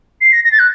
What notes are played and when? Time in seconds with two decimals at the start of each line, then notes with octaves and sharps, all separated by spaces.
0.21 C7
0.33 A#6
0.44 A#6
0.52 A6
0.59 F#6